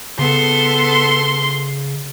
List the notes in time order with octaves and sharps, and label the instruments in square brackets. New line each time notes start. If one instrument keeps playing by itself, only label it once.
[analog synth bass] C#3 [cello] B3 A4 [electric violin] C6